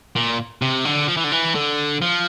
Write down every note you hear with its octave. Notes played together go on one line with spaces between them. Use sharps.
A#2
C3
D3
F3
E3
D3
E3
D3
F3